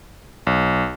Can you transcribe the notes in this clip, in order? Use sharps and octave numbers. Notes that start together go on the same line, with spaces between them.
B1